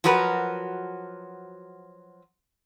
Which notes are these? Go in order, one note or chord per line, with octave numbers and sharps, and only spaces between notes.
F3 F#3 F#4 A#4 B4